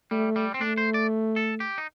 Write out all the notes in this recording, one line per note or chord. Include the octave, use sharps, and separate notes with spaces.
G3 A3
G3
C4
A3 D4
C5
D5
A4
G4
D#4